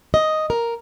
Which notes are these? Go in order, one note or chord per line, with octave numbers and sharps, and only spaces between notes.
D#5
A#4